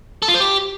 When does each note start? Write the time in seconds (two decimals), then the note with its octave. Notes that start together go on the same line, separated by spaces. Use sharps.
0.22 A4
0.28 F4
0.34 C5
0.40 G4